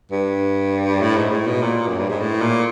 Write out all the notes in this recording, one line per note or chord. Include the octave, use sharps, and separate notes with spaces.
G2
A2
G#2
A2
B2
A#2
F#2
G2
G#2
A2
A#2